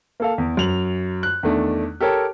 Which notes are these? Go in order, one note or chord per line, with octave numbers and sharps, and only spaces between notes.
A#3 A4 F5
E2
F#2 F7 F#7
F#6
E2 D#3 A3 D4
G4 A4 A#4 C#5